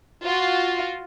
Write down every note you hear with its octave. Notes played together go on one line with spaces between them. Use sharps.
F4 F#4